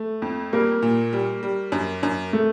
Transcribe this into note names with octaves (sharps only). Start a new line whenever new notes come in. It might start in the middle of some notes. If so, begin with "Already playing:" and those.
Already playing: A3
F2
G3 A#3
A#2
G3
G3
F#2
F#2
A3